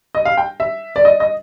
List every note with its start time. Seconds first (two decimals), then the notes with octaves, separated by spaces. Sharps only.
0.15 D#5
0.25 F5
0.37 G5
0.60 E5
0.96 D5
1.05 D#5
1.20 D#5